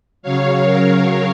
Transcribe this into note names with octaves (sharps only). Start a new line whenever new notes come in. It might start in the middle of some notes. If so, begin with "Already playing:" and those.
C#3 F#3 C#5 F5
A#4 C#5